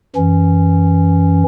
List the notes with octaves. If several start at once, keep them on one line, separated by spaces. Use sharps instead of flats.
F#2 E3 C#4